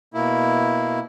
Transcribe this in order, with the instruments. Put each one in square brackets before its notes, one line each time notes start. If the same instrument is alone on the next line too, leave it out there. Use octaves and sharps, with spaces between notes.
[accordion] B2 A#3 E4